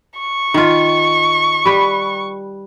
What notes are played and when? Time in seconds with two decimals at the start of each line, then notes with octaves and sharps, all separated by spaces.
0.19 C#6
0.54 D#3 F4
1.65 G3 B4